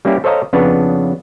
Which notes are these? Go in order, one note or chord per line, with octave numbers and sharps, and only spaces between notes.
G3 A#3 C#4 E4 G4
A4 C5 C#5 D#5 F5 A#5
F2 C#3 B3 D4 B4 C#5